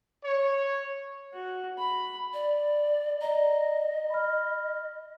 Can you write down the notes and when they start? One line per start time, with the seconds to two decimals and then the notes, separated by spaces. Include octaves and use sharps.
0.24 C#5
1.34 F#4
1.78 B5
2.33 D5
3.21 D5 D#5 A#5
4.10 B5 F6